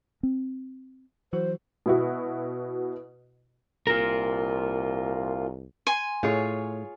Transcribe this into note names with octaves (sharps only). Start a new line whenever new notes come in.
C4
E3 F#3 F#4 C5
B2 E4 F#4
C2 F4 A#4
G#5 C6
A2 F4 G#4 C#5